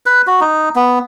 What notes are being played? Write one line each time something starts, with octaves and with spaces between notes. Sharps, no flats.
B4
F#4
D#4
B3